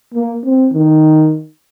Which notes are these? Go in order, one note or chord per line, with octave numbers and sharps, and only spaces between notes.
A#3
C4
D#3